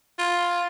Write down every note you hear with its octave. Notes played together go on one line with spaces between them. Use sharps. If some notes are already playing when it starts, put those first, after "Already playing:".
F4